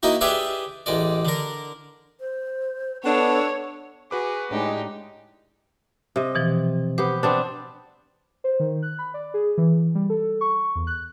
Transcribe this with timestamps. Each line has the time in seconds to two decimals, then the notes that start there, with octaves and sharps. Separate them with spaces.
0.03 A#3 D#4 E4 F#4
0.21 G4 G#4 B4 D5 E5
0.86 A1 G#3 D5
1.25 D3 A#4
2.20 C5
3.04 B3 D4 A4 C#5
4.11 F#4 G#4 B4 D6
4.51 A2 G#3 D4 D#4 G4
6.16 C3 D#5
6.35 B2 E3 F3
6.98 B3 G4 C5
7.23 B3 C4 D4
8.44 C5
8.60 D#3
8.82 F#6
8.99 B5
9.14 D5
9.34 G#4
9.58 E3
9.95 G3
10.09 A4
10.41 C#6
10.75 E2
10.87 F#6